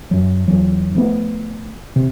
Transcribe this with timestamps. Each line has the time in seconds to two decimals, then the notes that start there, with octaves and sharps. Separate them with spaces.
0.11 F#2 F#3
0.48 E2 F#3
0.95 F3 A3 B3
1.96 C3